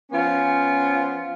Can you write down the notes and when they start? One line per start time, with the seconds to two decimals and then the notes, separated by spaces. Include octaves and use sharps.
0.12 F3 B3 C#4 F4